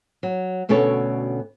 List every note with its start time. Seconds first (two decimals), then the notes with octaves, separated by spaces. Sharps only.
0.23 F#3
0.69 D2 B2 C#4 D4 A4 C#5